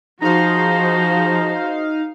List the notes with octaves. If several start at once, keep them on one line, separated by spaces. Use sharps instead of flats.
F3 D#4 F#4 G#4 C5 F5 A#5